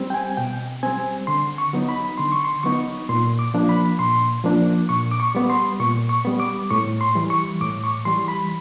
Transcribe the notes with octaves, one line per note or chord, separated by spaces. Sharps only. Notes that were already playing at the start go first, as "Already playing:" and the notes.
Already playing: G3 C4
G5
G#5
B2 G5
G3 C4 G#5
D3 C6
C#6
F#3 B3 D#4
B5
D3 C6
C#6
C6
F#3 B3 D#4 C#6
A#2 C6
D6
F3 A#3 D4
B5
A#2 C6
F3 A#3 D4
A#2 C#6
D6
C#6
G3 B3
C6
A#2 C#6
C#6
G3 B3
D6
A2 C#6
C6
E3 G3
C#6
A2 D6
C#6
E3 G3 C6
B5